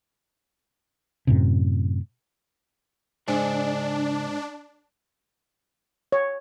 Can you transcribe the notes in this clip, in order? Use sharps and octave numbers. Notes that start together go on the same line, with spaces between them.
F#2 A2 C3
G#2 C#3 D4 D5 G#5
C#5